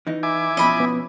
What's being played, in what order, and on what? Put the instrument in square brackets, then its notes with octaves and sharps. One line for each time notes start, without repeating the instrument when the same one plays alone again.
[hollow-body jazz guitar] E3 D#4
[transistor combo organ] E4 G#5 D6
[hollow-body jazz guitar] B2 F3 C#4 [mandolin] D#5 B5
[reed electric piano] B3